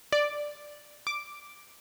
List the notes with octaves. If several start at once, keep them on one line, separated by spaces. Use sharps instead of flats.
D5
D6